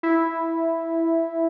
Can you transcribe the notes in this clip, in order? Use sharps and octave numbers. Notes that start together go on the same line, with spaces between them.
E4